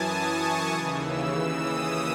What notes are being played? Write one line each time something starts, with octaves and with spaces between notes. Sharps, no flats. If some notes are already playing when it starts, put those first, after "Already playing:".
Already playing: F#2 E3 G#5 A5 D#6
C#6
D#2 C#3 E3 D#6
E6
E6
D#6